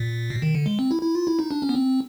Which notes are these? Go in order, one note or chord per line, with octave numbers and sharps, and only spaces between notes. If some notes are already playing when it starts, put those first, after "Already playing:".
Already playing: A#2
B2
D#3
D3
G#3
C4
E4
E4
F4
E4
D#4
D4
C#4
B3
C4